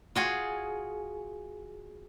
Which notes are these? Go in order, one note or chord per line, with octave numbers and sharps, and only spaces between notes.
F4 F#4 G#4